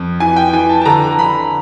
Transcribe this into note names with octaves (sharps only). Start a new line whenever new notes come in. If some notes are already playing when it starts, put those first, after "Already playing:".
Already playing: F2
E3 G#5
G5
E3 G#5
A5
A5
D3 A#5
D3 B5